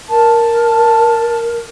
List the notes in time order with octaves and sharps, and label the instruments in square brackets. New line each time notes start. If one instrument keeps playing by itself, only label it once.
[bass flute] A#4 [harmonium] A5